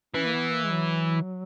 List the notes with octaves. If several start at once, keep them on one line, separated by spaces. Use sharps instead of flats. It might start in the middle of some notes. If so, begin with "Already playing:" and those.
E3 C#4
A#3
B3
A#3
G#3
F#3